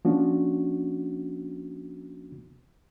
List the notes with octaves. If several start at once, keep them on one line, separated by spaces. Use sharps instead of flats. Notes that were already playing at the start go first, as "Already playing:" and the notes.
F3 A#3 C#4 D4 F#4